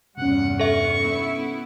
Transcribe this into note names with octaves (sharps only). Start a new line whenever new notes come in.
E2 G2 C3 C#4 F#5
A4 E5 C#6
B3 E4